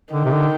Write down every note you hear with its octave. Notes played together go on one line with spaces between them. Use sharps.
D3 D#3
C3
D3